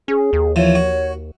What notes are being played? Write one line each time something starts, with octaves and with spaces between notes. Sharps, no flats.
C#4 G#4
D#2
E3 F3 C#5
F#4